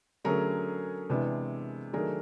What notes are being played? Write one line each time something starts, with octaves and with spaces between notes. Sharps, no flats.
D3 F#3 A3 C#4 G#4 A#4
C3 E3 G#3 B3 D4
D#3 F#3 A3 D4 G#4 A#4